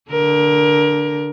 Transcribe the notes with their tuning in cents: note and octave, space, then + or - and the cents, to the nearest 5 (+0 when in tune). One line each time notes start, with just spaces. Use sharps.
D3 +0 A#4 +25